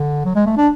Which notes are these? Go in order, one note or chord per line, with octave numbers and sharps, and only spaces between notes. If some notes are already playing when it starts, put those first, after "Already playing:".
Already playing: D3
F#3
G#3
A3
D4